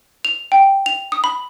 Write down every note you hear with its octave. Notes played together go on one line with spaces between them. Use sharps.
F7
G5
F7
D#6
B5